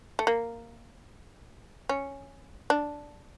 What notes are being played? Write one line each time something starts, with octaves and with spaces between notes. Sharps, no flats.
A3
A#3
C#4
D4